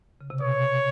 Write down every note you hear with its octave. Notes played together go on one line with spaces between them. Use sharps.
C#3
C3
B2 C#5